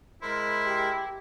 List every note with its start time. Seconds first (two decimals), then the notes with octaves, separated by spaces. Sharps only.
0.22 G#3 E4 A#4 C5 B5
0.66 G4